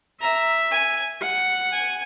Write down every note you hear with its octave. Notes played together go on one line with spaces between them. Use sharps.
E5 A#5
G#5
F#5
G#5